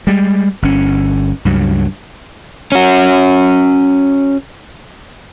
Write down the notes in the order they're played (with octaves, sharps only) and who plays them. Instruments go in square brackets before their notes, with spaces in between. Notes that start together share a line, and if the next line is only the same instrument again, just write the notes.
[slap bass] G3 G#3
G1 C#4
C#2 G2 F#3
[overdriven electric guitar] C#4 F#4